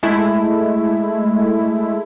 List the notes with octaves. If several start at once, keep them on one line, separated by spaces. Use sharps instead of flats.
G#3 A3 E4